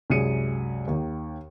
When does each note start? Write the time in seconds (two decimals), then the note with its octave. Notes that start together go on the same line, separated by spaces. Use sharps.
0.10 C2 F#2 G#3 G#4 C#7 D#7
0.87 D#2 D#3